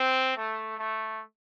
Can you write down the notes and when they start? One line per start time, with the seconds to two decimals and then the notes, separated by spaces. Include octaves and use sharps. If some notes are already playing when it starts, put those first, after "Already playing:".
Already playing: C4
0.35 A3
0.77 A3